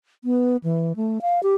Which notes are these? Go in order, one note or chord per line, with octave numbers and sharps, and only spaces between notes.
B3
E3
A3
F5
G4